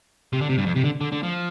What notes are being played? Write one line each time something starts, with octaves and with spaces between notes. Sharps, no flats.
C3
D3
C3
G2
F2
C3
D3
D3
D3
F3